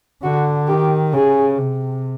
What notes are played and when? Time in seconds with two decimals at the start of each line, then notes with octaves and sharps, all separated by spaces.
0.23 D3 F#4
0.68 D#3 G4
1.13 C#3 G#4
1.58 C3